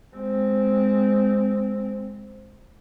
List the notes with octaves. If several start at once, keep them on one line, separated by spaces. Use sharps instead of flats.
G#3 C4